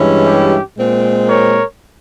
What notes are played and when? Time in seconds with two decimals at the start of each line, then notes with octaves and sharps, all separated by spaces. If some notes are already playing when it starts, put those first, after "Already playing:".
Already playing: G2 E3 G#3 C#4 E4
0.26 G4
0.77 A#2 G#3 C4
1.28 A#4 C#5